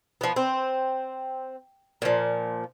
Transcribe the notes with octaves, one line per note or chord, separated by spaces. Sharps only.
F3 B3
C4
A#2 F3